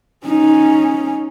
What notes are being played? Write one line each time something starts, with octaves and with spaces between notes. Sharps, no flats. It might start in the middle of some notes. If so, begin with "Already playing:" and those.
C#4 D#4